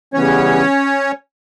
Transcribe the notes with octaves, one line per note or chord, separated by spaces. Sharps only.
C#3 E3 G3 B3 C#4 C#5